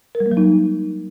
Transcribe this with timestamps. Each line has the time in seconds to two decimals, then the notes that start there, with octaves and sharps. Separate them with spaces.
0.15 A#4
0.20 G3
0.26 A#3
0.31 F#3
0.37 D#4